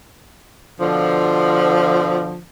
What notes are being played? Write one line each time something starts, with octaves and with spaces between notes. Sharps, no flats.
B2 D3 F3